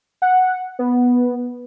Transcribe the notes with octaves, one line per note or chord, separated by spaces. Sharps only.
F#5
B3